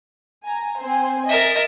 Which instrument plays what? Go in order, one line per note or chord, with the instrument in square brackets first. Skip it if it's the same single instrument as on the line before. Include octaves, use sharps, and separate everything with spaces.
[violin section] G#5 A#5
C4 C5 G#5
[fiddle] A#4 E5 [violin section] D#5 A6